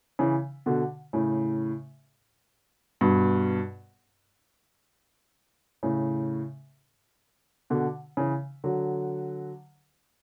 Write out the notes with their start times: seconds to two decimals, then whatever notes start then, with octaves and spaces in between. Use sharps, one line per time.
0.19 C#3 E3
0.66 B2 D3
1.13 A2 C#3
3.01 G2 B2
5.83 A2 C#3
7.70 B2 D3
8.17 C#3 E3
8.64 D3 F#3